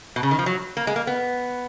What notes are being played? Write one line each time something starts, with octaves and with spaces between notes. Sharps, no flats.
B2
C#3
D#3
F3
F#3
A#3
G#3
A#3
B3